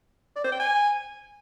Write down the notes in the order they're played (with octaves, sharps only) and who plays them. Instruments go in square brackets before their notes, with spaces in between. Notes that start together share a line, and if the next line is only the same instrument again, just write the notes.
[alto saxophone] D5
C5
G5
G#5